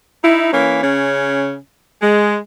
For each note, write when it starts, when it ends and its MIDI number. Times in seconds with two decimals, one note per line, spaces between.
0.23 0.50 63
0.23 0.50 64
0.52 0.81 52
0.52 0.81 58
0.52 0.81 61
0.83 1.57 49
0.83 1.57 61
2.02 2.37 56